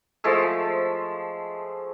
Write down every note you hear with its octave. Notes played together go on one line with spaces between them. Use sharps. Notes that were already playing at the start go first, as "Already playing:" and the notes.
F3 G#3 A3 E6